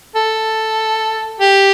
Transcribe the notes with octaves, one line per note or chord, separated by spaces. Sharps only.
A4
G4